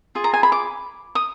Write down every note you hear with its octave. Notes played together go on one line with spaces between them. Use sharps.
F4 G#4
A#5
G#5
B5
D6
D#6